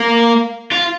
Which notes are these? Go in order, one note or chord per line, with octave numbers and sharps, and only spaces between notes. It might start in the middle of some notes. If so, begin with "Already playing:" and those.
Already playing: A#3
F4